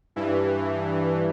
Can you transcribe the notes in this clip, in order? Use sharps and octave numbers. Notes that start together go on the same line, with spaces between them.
G2 E3